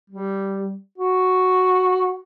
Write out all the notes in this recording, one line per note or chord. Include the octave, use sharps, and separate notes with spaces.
G3
F#4